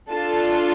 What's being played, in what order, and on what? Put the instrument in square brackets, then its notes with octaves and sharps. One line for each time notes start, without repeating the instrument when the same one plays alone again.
[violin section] D4 F4 A4 A5